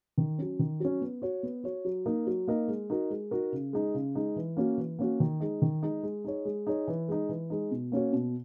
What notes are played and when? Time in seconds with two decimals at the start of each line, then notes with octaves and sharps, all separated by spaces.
0.18 D#3
0.38 F#3 C#4
0.59 D#3
0.80 F#3 C#4
1.01 B3
1.22 F#4 C#5
1.43 B3
1.64 F#4 C#5
1.85 F#3
2.06 A#3 D#4 A#4 D#5
2.27 F#3
2.48 A#3 D#4 A#4 D#5
2.68 G#3
2.90 D#4 F#4 A#4
3.10 G#3
3.31 D#4 F#4 A#4
3.52 C#3
3.73 G#3 D#4
3.94 C#3
4.15 G#3 D#4
4.36 E3
4.57 A#3 C#4 F#4
4.77 E3
4.99 A#3 C#4 F#4
5.20 D#3
5.40 G#3 D#4
5.62 D#3
5.83 G#3 D#4
6.03 G#3
6.24 D#4 G#4 C#5
6.45 G#3
6.67 D#4 G#4 C#5
6.88 E3
7.08 G#3 D#4
7.29 E3
7.50 G#3 D#4
7.71 B2
7.92 A#3 C#4 F#4 C#5
8.13 B2